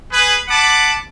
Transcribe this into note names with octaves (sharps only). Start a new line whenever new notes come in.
G#4 B4
F#5 A5 B5 D6